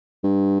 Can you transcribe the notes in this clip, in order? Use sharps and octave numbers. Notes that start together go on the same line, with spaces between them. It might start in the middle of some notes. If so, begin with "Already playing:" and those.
G2